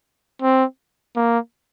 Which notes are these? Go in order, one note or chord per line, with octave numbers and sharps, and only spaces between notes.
C4
A#3